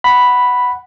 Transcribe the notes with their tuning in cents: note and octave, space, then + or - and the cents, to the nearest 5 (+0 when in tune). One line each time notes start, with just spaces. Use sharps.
F#5 +0 B5 +0